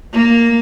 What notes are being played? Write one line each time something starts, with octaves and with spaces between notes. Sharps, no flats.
A#3